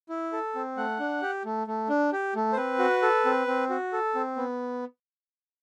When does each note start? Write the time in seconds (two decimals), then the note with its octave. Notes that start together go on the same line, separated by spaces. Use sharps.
0.09 E4
0.32 A4
0.55 C4
0.77 A3 F#5
0.99 D4
1.22 G4
1.45 A3
1.67 A3
1.89 D4
2.13 G4
2.35 A3
2.53 C5
2.57 C4 B4
2.79 F#4
3.02 A4
3.25 C4
3.47 C4
3.70 F#4
3.93 A4
4.15 C4
4.37 B3